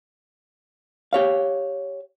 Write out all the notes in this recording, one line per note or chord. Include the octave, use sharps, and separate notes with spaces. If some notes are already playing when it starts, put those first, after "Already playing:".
G4 C#5 F5